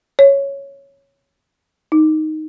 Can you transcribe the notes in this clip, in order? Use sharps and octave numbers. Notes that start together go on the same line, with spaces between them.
C#5
D#4